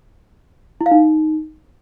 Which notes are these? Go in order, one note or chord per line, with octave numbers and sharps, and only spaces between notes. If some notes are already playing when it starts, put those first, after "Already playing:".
E4
F5
D#4